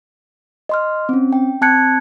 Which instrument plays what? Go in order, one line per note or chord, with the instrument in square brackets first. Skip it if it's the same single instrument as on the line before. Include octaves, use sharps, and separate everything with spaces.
[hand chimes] D#5 C6 F6
C4 C#4
G5
C4 A5 F#6 G#6 C#7